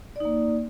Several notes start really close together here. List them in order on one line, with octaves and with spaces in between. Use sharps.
D5 D#4 A#3